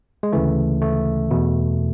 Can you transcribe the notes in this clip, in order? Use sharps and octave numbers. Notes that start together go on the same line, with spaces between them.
G#3
D2 C#3 E3 A3
A3
E2 B2